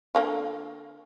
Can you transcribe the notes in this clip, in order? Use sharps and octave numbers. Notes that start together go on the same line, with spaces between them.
D3 A#3 F4